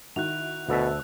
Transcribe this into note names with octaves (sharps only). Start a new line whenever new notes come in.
D#3 E4 F#4 F#6 F7
D2 B2 A4 E5